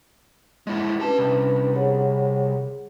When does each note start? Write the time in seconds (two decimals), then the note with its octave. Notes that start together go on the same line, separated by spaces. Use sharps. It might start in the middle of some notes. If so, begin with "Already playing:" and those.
0.67 G#3 E4
1.00 C#4 D4 G4 B4 A5
1.19 C2
1.74 G#4 C#5 F#5